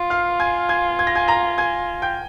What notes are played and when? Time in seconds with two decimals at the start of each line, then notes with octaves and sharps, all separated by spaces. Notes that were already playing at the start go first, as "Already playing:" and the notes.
Already playing: F4
0.10 F5 F6
0.40 G#5 G#6
0.69 G#5 G#6
0.99 G#6
1.07 A#6
1.15 G#5 G#6
1.28 A#5 A#6
1.58 G#5 G#6
2.02 G5 G6